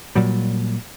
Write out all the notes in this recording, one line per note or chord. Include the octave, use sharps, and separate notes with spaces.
A#2 F#3 G3